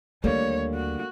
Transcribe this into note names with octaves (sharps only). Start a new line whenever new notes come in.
D#2 D3 G3 A3 A#3 C#5
F#4